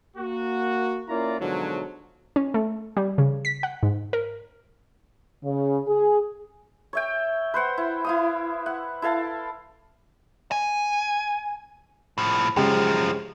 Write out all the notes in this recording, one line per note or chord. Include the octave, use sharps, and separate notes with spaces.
A#3 F#4
A#3 C#4 E4 F4 D5 A#5
G#2 B2 D3 F3 F#3
C#4
A3
G3
C#3
B6
F#5
G#2
A#4
C#3
G#4
C#5 E5 G5
B4 C5 F#5 G5
E4
E4 F5 D#6
F#5
E4 A4 F5 A5
G#5
A2 F3
F#2 C#3 F3 G#3 G4